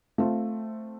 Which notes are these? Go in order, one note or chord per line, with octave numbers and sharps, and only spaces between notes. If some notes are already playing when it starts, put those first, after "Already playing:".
A3 C4 F4